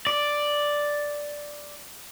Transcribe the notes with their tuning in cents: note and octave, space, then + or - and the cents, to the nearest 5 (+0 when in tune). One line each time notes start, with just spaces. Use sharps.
D5 +0